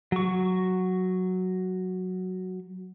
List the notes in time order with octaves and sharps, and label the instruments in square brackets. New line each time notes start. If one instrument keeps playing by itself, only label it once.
[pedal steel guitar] F#3 C#6